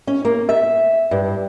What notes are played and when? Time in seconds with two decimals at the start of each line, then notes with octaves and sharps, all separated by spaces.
0.07 C#4
0.25 A#3
0.49 E5
1.11 G2